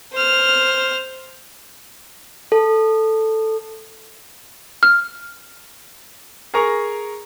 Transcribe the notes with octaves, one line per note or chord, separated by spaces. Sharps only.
C5 F6
A4
F6
G#4 A#4 A#5 C#6